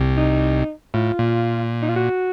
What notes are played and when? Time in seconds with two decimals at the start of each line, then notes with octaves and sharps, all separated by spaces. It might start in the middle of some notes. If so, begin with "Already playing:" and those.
Already playing: C2 C3
0.17 D#4
0.94 A2 F4
1.19 A#2
1.82 D#4
1.89 F4
1.96 F#4